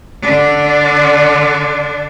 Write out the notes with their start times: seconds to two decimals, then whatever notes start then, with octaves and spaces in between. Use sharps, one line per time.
0.21 D3 D4